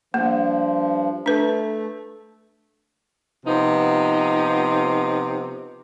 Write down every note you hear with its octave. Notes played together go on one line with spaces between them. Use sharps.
G2 F3 A#3
A3 D4 B4
C3 F3 B3 D#4